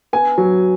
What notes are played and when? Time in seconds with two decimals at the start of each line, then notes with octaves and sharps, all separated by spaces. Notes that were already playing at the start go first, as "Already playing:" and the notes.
0.13 B3 G#5
0.38 F#3